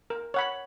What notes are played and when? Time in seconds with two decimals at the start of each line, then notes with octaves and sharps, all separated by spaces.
0.10 A#4
0.34 C#5 F#5 B5